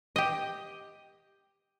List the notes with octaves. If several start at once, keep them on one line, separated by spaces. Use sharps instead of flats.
G4 D#5